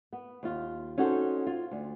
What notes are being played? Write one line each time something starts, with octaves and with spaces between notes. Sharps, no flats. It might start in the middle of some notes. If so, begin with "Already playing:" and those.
B3
D#2 F4
C#4 D#4 F#4 A4 C5
F4
D2